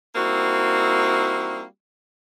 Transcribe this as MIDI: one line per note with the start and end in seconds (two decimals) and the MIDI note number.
0.16 1.64 55
0.16 1.64 58
0.16 1.64 60
0.16 1.64 63
0.16 1.64 64
0.16 1.64 66